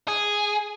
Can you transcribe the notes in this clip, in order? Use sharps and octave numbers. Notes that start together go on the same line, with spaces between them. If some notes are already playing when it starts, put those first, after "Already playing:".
G#4